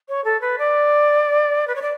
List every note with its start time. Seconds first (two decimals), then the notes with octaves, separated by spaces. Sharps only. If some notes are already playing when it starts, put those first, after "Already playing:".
0.09 C#5
0.24 A4
0.41 B4
0.58 D5
1.67 B4
1.75 C#5
1.81 D5